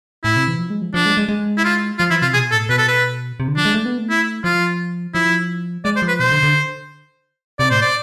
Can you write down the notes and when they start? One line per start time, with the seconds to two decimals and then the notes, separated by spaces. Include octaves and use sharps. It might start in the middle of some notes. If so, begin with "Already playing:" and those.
0.24 A2 E4
0.36 C3
0.48 E3
0.59 F3
0.70 G#3
0.82 F3
0.94 F3 D4
1.06 G#3
1.17 G#3
1.29 G#3
1.58 E4
1.65 F4
1.99 F3 F4
2.10 E3 E4
2.22 C3 F4
2.34 B2 G#4
2.52 A2 A4
2.69 B2 B4
2.78 A4
2.88 B4
3.40 C3
3.48 D3
3.57 F3 D4
3.65 G#3
3.74 A3
3.85 B3
3.98 A3
4.10 E4
4.44 F3 F4
5.14 F3 E4
5.85 G#3 D5
5.96 C5
6.02 F3
6.08 B4
6.20 B2 C5
6.31 D3
6.43 D3
7.59 C3 D5
7.70 A2 C5
7.82 D5